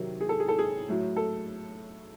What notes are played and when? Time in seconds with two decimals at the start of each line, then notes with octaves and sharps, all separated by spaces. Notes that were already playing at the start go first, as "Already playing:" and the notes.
Already playing: C3 D#3 F#3
0.21 G#4
0.29 A4
0.40 G#4
0.48 A4
0.59 G#4
0.88 A2 F#3
1.16 A4